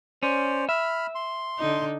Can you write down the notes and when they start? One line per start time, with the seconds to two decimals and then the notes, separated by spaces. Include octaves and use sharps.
0.23 C#4 C5 D5
0.69 E5 B5 F6
1.15 C6
1.59 D3 D#4